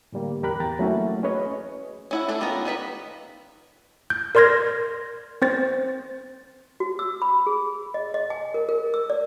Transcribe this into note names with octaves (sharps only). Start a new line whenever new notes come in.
A2 D3 G3 A#3
E2 G4 A#4 B5 F#6
E2 G5 A#5 A6
F#3 A3 A#3 C#4 E4 F#4
C#4 G#4 B4 C#5 D#5
C#4 E4 F#5
A3 D4 E4 A4
D#3 B3 C#4 F4 A#5
D#3 G3 B4 B5
G6
A#4 D5 C6 F6 G#6 A#6
C4 C5 A6
F#4
E6
B5
G#4
D#5
D#5
G#5
A#4
A#4
E6
D5